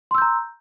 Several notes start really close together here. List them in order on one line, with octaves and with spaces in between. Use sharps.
C6 E6 G6 A#5